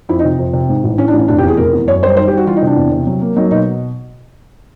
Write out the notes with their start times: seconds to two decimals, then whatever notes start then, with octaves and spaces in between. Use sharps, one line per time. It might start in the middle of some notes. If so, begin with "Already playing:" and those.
0.09 F2 E4
0.19 D#4
0.24 C3
0.39 F2
0.53 C3
0.69 G#2
0.84 A1
0.98 E3 C#4
1.08 D4
1.13 A1
1.19 C#4
1.28 F1 D4
1.38 G4
1.43 E2
1.48 G#4
1.57 F1 A#4
1.73 E2
1.87 F#2 C#5
2.03 G3 C5
2.17 D#3 C5
2.28 G4
2.31 G3
2.37 F#4
2.46 E3 F4
2.56 D#4
2.62 C3 D4
2.76 E2
2.92 C3
3.07 F#3
3.21 A#3
3.36 F#3 D#4
3.51 B2 D#4